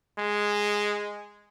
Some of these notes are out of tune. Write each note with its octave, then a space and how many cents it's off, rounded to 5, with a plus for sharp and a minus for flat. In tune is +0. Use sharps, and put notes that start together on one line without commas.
G#3 -5